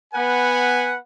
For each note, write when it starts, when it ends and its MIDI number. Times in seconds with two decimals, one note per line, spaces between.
0.14 0.96 59
0.14 0.96 71
0.14 0.96 78
0.14 0.96 80